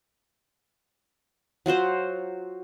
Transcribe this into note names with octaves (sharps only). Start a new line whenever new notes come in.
F#3 F4 F#4 C5